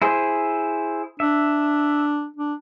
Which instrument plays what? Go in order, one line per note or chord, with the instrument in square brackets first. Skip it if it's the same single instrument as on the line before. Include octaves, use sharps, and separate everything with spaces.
[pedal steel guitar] E4 G#4 C5
[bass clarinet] D4 [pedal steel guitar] E5
[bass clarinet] D4